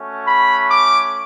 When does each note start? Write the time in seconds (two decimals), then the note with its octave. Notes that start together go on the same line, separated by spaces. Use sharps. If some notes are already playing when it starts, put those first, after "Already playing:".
Already playing: A3 C#4 F#4
0.28 B5
0.70 D6